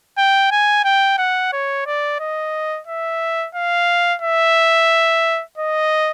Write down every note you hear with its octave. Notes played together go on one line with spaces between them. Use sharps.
G5
G#5
G5
F#5
C#5
D5
D#5
E5
F5
E5
D#5